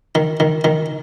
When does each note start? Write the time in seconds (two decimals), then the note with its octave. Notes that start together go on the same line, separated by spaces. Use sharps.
0.15 D#3
0.40 D#3
0.64 D#3